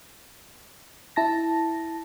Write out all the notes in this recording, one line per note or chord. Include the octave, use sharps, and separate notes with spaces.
E4 A5 A#6